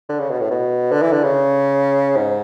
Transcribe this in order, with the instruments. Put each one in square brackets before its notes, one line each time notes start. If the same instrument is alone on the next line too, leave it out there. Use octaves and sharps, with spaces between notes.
[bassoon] D3
C#3
B2
A2
B2
D3
E3
D3
C#3
G#2